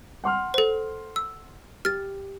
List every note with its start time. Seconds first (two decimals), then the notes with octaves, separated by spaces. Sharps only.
0.24 F#5 C6 F6
0.54 A4 C5
1.16 E6
1.85 G4 F6 A6